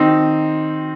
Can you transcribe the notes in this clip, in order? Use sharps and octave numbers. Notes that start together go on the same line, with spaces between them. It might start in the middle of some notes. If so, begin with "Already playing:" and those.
Already playing: D#3 C4 D#4